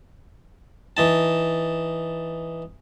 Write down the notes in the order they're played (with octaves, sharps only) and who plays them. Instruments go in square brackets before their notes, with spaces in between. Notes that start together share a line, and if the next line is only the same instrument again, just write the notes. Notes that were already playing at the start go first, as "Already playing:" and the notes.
[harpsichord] E3 D#4 A5